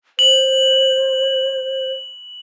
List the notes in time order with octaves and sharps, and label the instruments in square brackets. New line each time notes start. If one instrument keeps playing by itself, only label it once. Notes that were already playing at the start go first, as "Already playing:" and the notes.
[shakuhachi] C5 [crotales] F#7